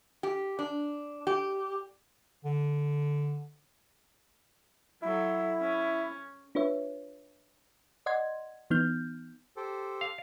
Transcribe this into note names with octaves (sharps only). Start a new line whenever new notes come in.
G4
D4
G4
D3
F#3 E4 A4
C#4
D4 F4 B4 C#5 E5
D5 D#5 F#5 C6 G#6
E3 B3 D#4 F6 G6
G4 A4 C5
F5